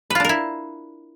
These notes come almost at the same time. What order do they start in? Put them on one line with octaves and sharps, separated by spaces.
B4 F4 D4 A#4 E4